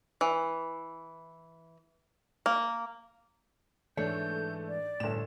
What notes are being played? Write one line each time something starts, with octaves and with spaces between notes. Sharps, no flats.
E3
A#3
G#2 E3 A3 D4 C#5 G6
D5
G1 A2 E7